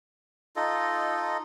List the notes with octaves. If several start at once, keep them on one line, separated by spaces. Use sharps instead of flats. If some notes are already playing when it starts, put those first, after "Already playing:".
D#4 F4 A4 D#5